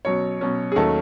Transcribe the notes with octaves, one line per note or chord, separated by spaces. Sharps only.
B2 F#3 C#4 C#5
B2 F#3 C#4
G#4
D#2 D#3 F#3 A3 C#4 A4